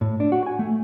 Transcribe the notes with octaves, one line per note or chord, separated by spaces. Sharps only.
A2
D4
F#4
G#5
A3